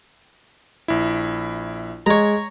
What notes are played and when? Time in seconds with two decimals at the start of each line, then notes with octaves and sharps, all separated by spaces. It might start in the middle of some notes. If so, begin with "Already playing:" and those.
0.88 A#1 E4
2.06 G#3 C#5 A#5